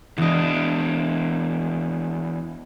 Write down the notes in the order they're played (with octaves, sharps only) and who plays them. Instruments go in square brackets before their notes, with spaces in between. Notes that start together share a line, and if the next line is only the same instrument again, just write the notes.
[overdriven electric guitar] E2 D4 [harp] E3 D#5